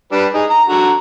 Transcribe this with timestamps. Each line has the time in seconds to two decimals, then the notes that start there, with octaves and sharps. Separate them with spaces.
0.12 G3 D4 B4
0.34 D#4 G#4
0.50 A#5
0.68 D3 F#4 A#5